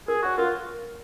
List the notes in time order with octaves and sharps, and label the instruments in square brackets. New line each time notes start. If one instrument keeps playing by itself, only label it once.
[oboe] G#4 [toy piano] A#4
[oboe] F#4 [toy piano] C#5 F#5 C#6
[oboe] F4 [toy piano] A#4